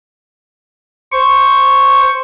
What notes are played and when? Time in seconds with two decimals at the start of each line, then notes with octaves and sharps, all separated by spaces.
1.12 C5 C#6